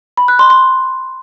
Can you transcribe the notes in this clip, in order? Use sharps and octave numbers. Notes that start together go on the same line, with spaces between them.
B5
F#6
C6
C6